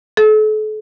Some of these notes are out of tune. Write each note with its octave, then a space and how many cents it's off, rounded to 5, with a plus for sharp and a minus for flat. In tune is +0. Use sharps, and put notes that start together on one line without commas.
A4 -40